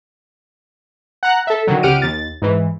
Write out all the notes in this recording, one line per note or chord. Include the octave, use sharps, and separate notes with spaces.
F#5 A#5 F#6
A4 E5
D3 D#3 F#3
C#2 G4 F#5 F6 D7 D#7
D#2 A6
G#2 E3